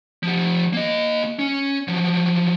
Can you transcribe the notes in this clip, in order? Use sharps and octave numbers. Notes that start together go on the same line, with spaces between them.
F3 G4
A#3 D#5
C#4
F3 F#3